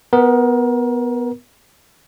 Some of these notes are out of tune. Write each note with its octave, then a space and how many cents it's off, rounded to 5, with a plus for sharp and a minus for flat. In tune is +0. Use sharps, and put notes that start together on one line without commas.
B3 +0 A#4 +25